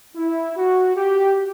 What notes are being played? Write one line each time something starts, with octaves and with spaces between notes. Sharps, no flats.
E4
F#4
G4